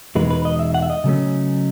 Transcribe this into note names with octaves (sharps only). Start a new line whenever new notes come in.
E2 B2 G#3 D#4 B4
B4
D#5
E5
F#5
E5
D#5
C#3 F#3 A3 C#4